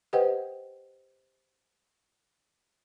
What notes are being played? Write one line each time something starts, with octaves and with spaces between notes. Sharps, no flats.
G4 B4 C5 D#5 F#5 G5